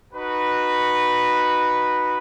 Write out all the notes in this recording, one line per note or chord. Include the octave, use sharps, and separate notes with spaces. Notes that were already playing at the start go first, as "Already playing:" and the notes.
D#4 F#4 B4